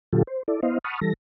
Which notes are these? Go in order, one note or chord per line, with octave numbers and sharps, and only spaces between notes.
A#2 D3 F#3 F4 G4 A4
C5
E4 A4 D5
B3 E4 C5 D#5 F5
F#5 A5 B5 C#6 D#6 F6
E3 G3 A4 A#6